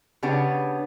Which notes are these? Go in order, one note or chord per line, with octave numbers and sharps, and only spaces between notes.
C#3 B3 D4 G4 C#5